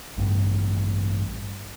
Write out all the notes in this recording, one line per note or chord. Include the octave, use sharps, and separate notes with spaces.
A1 G2